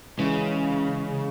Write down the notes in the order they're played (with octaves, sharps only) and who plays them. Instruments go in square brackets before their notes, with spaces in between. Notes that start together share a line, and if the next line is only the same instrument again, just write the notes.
[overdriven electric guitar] C#3 [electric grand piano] E3 G#3 C#4